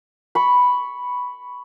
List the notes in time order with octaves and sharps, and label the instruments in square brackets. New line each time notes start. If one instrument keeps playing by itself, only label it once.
[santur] B5 C#6